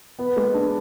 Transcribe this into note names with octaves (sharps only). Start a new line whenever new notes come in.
B3
G#3
D4